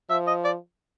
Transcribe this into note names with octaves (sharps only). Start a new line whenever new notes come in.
F3 E5
D#5
D5